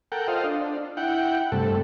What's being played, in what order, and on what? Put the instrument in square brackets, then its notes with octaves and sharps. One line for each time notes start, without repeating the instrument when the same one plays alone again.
[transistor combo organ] A4 A#4 F#5 G5
F4 A4 C5 D#5 F5
D4
E4 F#5 G5
G2 C3 A3 A4